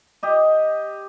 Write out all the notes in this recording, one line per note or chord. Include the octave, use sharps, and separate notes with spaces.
G4 D#5